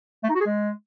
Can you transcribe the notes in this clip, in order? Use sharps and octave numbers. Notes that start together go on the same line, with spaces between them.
A3
D#4
F#4
G#4
G#3